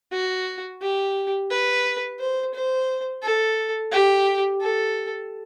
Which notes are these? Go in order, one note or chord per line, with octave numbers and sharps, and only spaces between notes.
F#4
G4
B4
C5
C5
A4
G4
A4